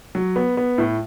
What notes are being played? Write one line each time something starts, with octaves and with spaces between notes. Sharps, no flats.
F#3
B3
B3
A2